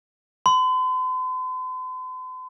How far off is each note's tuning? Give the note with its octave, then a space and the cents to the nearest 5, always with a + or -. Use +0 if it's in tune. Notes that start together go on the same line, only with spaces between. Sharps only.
C6 -45